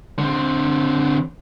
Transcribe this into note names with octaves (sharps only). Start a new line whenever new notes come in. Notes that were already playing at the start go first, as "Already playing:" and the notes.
D3 C4